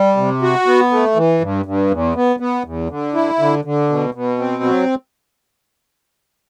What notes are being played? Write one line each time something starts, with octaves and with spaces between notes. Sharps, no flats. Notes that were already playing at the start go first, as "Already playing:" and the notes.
Already playing: G3
C3
F#4
B3
A3
E3
G2
G2
E2
B3
B3
E2
D3
E4
D3
D3
B2
B2
C4
F#3